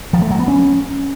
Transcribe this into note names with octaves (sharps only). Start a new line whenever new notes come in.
F3
A3
F#3
B3
C#4